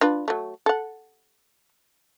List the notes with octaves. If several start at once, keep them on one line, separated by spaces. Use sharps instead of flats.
D4 F4 B4
F#3 A3
A4 F#5